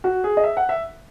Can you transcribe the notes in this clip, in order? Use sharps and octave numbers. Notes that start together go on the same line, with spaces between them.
F#4
G#4
D#5
E5
F#5
E5